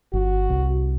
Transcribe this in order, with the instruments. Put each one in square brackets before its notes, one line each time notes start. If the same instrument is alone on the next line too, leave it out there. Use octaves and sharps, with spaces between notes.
[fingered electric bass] G1 [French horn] F#4
[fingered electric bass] C2